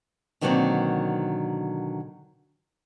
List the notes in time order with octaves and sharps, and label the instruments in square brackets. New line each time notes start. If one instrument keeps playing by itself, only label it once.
[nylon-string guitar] B2 D3 D#3 F#3 A#3 C4